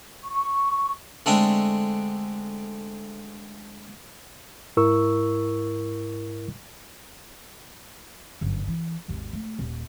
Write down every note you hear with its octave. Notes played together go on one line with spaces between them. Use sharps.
C#6
D3 G#3 A3 C4 D4
G#2 E4 A#4 C#6 E6
G1 F#2
E3
G#1 D#2
A3
D#1